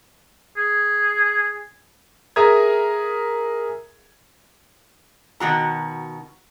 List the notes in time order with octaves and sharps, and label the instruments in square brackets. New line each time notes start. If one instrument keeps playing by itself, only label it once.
[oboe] G#4
[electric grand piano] G#4 A#4 E5 A#5 D#6 G#6
[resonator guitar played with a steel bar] B2 D#3 F#4 A#5